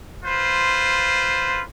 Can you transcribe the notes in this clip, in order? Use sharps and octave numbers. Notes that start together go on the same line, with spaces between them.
F4 B4 C5